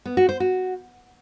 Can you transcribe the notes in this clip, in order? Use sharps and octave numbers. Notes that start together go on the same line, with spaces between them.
B3
F#4
C5
F#4